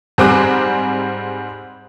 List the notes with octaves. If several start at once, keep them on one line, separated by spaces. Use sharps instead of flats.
G#2 G3 C4 G#4 D6 F#6